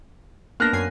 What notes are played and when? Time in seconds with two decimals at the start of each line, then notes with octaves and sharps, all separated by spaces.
0.60 A#3 B3 D4 F6 F#6 A#6
0.73 F#2 G#5 C7